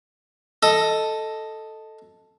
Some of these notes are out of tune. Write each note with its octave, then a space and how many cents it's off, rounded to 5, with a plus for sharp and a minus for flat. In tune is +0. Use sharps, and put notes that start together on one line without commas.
A4 +0 D#5 +0